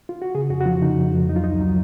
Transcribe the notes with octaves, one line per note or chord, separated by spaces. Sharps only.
F4
F#4
C#3 G#4
F2 F#4
F#4
F3 F4
C#3 D#4
F2
F2
F#3 D#4
F4
C#2 D#4
F#3